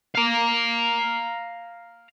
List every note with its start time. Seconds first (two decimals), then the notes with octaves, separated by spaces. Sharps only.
0.15 F5 A#5